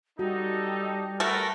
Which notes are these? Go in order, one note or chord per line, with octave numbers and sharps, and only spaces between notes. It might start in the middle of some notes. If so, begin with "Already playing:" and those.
G3 D#4 F#4 A4
A3 F#4 A#4 B4